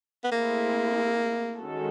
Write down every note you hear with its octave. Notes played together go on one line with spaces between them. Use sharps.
B3
A3 A#3 C4 E4 G#4
D#3 G#3 C#4 F#4 A4